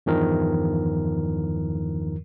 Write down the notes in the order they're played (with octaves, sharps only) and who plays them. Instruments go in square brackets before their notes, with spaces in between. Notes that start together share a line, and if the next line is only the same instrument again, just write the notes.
[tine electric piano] E2 G2 D#3 F3 A#4